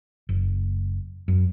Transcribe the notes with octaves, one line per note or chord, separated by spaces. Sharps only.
F#1
F#2